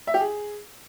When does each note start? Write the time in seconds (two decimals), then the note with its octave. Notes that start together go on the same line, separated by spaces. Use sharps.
0.07 E5
0.14 G4
0.21 G#4